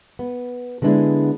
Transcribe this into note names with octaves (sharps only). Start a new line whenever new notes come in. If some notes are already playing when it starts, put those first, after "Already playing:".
B3
D3 G#3 B3 D4 E4 G#4